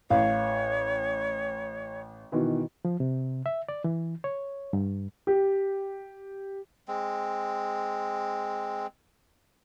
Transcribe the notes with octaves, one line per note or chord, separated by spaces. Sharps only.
A1 C#5 F5
B2 D#3 E3
F3
C3
E5
D5
E3
C#5
G2
G4
G#3 C4